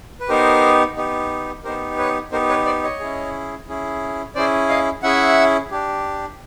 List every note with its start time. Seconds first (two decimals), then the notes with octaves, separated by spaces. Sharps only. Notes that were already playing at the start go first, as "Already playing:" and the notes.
0.20 B4
0.29 B3 D#4 G4 A#4 C5
0.96 B3 D#4 G4
1.64 B3 D#4 G4 A#4 C5
1.98 B4 C#5
2.32 B3 D#4 G4 A#4 C5
2.49 B4 C#5
2.66 C5 D5
2.83 C#5 D#5
3.00 C#4 E4 G#4
3.68 C#4 E4 G#4
4.35 C#4 E4 G#4 C5 D5
4.69 D#5 F5
5.03 C#4 E4 G#4 E5 F#5
5.71 D4 G4